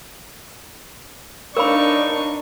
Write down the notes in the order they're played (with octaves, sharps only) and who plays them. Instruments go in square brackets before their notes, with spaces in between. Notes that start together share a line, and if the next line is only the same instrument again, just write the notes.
[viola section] D4 [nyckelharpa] D#4 C#6 [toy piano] A#4 B5 [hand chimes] B4 C#5 F5